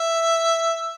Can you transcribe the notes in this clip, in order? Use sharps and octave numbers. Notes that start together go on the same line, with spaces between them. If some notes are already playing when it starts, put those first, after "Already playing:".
Already playing: E5